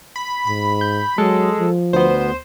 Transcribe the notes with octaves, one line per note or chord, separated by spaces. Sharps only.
B5
G#2 B5
G6
F#3 G#3 A4
F3
D2 B3 C5